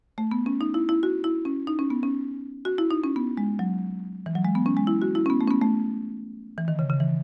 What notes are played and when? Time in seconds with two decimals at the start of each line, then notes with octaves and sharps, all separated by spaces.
0.18 A3
0.31 B3
0.46 C#4
0.61 D#4
0.74 E4
0.89 E4
1.03 F#4
1.24 E4
1.45 C#4
1.67 D#4
1.79 C#4
1.90 B3
2.03 C#4
2.65 F#4
2.78 E4
2.91 D#4
3.04 C#4
3.16 B3
3.37 G#3
3.59 F#3
4.26 E3
4.35 F#3
4.45 G#3
4.55 B3
4.66 C#4
4.77 G#3
4.87 E4
5.02 F#4
5.15 E4
5.26 C#4
5.30 B3
5.41 A3
5.48 C#4
5.51 B3
5.61 A3
6.58 E3
6.68 D#3
6.79 C#3
6.90 C#3
7.00 E3